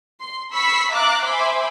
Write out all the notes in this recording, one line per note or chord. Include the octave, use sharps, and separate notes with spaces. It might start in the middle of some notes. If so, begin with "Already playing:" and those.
C6
B5 C#6 E6 B6 C7
E5 F5 A#5 D6 F#6 A6
C5 E5 G#5 B5 C6 D6